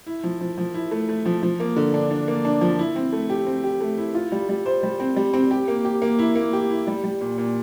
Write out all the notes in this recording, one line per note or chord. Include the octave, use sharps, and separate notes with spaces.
E4
F3
F3
F3
E4
A3
A3
F3
F3
A#3
D3
D4
D4
A#3
D4
F3
E4
C4
A3
G4
C4
G4
A3
E4
F4
G3
G3
C5
G3
C4
G3
C4
G4
A#3
G4
A#3
E4
A#3
G4
E4
G3
G3
A#2
A#2